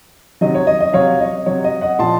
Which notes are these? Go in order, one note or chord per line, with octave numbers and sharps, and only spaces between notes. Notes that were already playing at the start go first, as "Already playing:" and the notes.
C3 D#3 F#3 D#5
C#5
D#5
D#5
C3 F#3 C#5 F5
D#5
C3 F#3 C#5
D#5
D#5 F#5
A#2 F3 A5 C6